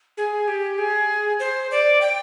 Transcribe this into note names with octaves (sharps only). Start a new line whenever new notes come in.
G#4
G4
G#4
C5
D5
G5